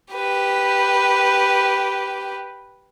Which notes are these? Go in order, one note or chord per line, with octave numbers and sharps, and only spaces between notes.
G4 B4